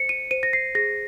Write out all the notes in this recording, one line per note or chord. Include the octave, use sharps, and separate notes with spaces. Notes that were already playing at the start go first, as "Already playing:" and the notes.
Already playing: C5 C#7
D#7
C5 D#7
A#6
C7
G#4 A#6